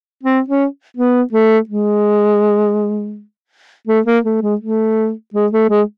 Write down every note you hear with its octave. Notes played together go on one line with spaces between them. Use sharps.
C4
C#4
B3
A3
G#3
A3
A#3
A3
G#3
A3
G#3
A3
G#3